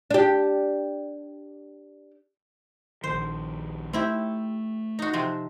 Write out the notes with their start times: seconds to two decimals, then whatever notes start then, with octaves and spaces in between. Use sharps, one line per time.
0.10 D4 G4
3.04 A#1 D#3 F3 C5
3.93 A3 C4 E4 G4
4.99 D#4 F#4
5.13 C3 F3 C4